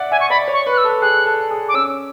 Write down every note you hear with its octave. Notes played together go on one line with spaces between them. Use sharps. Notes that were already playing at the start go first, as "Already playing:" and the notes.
Already playing: D5 E5 F#5
E5 G#5
C#6
D5 B5
C#5
C#6
B4
F#6
E6
A4
G#4 F#6
A4
G#4
D6
C#4 E6